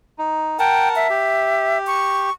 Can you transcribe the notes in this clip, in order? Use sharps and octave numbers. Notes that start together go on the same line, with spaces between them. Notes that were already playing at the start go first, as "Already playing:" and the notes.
D#4
A#4 F#5 G5 A5
E5
G4
C#6